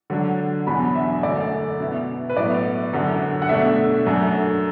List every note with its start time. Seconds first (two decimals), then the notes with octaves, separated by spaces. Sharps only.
0.10 D3 F#3 D4
0.67 E2 B2 F#3 D4 B5
0.95 E5
1.23 F#2 D3 A3 E4 D5
1.80 B2 B3 E4
2.29 B4
2.36 A2 F#3 B3 E4 D5
2.93 F#2 D3 F#3 D4
3.42 F#5
3.49 B2 A3 D4 E5
4.06 F#2 F#3 A3 D4